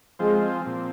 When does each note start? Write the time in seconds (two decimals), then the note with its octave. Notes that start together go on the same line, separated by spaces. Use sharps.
0.19 F3 G#3 C4 F4 G#4 C5
0.62 A#2 F3 C4